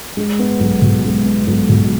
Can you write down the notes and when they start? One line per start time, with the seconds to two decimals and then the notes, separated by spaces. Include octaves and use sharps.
0.17 G#3
0.39 B3
0.60 B1
0.82 B2
1.04 G#3
1.25 B3
1.47 B1
1.69 B2